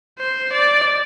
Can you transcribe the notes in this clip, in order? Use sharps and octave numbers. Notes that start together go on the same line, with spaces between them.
C5
D5